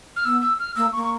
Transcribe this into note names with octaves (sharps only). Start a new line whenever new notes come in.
F6
B3 E6
E6
F6
A#3 E6
C#6
A#3
C#6